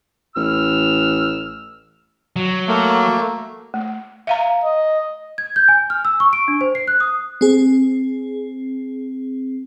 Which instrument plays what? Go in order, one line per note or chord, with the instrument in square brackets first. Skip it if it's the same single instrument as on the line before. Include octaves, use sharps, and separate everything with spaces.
[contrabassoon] A1 [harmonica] E6 F6
[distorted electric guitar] F#3
[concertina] A3 A#3
[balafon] A3
E5 F5 A#5
[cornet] D#5
[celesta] G#6
G6
G#5
F6
E6
C#6
D7
D4
C5
C7
F#6
D#6
[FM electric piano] C4 G#4